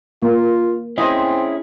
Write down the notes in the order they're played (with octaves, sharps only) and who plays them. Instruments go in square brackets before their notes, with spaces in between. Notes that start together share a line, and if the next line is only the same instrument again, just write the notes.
[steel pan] A#3 [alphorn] F4
[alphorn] C4 [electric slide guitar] C#4 E4 G#4 [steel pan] C5 D#5